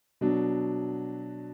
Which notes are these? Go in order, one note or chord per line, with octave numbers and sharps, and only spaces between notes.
B2 F#3 D4